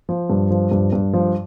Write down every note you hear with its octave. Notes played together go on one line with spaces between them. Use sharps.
F3
G2
F3
G2
G2
F3